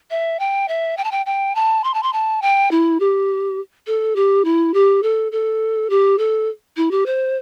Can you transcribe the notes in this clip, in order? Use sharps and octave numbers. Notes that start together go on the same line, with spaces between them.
E5
G5
E5
G5
A5
G5
G5
A5
C6
A5
C6
A5
G5
E4
G4
A4
G4
E4
G4
A4
A4
G4
A4
E4
G4
C5